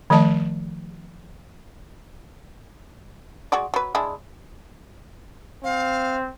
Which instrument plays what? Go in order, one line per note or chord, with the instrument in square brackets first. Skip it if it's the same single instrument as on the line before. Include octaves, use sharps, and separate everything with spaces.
[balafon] D#3 F3 A3 D#5 A5
[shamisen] G#3 F#4 D5
F#3 B4
G#3 D4 E4
[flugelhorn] C4 [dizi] F5